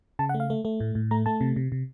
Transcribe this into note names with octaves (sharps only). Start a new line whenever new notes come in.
C#3 A5
F#5
A3
F5
A3
A3
A2
A2
A3 A#5
A3 A5
C3
C3
C3